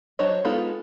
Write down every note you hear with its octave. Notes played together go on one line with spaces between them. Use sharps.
F#3 D4 C5 C#5 D#5
G#3 B3 D#4 F4 A4